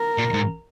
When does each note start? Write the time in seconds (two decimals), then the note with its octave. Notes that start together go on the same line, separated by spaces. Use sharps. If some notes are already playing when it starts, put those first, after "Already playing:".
Already playing: A#4
0.18 A#2
0.34 G#2